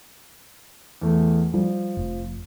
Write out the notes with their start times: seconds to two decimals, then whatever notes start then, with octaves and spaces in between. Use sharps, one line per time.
1.01 E2 A3
1.54 F3 G3
1.97 F1